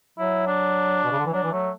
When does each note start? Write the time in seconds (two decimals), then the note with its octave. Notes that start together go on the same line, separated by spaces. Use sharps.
0.18 F#3 E4
0.47 D4
1.04 B2
1.11 C#3
1.19 D3
1.26 E3
1.33 F#3 D4
1.43 E3
1.52 F#3 A3